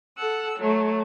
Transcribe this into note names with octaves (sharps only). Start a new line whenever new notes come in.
A4 F#5 E6
F#3 A3